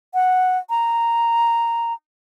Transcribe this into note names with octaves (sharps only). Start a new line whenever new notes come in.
F#5
A#5